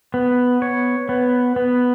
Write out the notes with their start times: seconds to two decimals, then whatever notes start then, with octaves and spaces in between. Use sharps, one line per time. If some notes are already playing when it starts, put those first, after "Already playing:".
0.14 B3
0.62 C#5
1.09 B3
1.56 B3